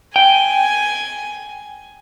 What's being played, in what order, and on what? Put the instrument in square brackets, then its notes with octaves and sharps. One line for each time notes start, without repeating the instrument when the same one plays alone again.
[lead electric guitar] G5 [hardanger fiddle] G#5